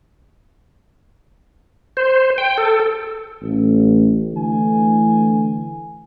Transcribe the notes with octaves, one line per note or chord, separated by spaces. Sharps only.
C5
G5
A4
A1
D3 E3 A3 D4 G#5